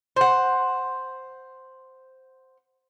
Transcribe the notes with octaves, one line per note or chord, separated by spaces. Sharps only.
C5 F#5